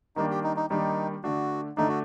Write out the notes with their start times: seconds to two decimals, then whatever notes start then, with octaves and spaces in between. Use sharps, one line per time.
0.16 D#3 G3 A#3 D4 D#4
0.30 G4
0.44 D#4
0.57 D#4
0.70 D#3 G3 A#3 D4 D#4
1.23 D3 A3 D4 F#4
1.77 D3 A3 D4 D#4
1.89 F#4